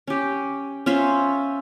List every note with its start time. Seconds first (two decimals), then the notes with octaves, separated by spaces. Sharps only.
0.07 C#4 G4
0.86 C#4 F4 C5 E5